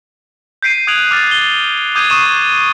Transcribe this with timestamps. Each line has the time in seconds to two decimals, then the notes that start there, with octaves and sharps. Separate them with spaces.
0.63 G6 B6 C7 D7 D#7
0.87 D#6 F#6 G#6 D7 F7 F#7
1.11 D6 F6 A6
1.31 G7
1.95 D6 D#6 G6 G#6 D#7
2.10 C#6 D#6 D#7 E7